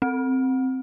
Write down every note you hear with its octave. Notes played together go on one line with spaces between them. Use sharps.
C4